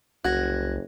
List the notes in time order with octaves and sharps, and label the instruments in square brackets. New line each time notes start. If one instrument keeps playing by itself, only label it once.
[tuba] F#1 [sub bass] C2 [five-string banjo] F#4 [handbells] F#6 G#6 A#6